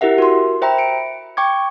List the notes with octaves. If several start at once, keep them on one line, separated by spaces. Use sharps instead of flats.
E4 G4 A#4 E5 F#5
F#4 A#4 C6
C5 E5 G5 A#5 B5
C#7 D7
G5 C#6 D6 G#6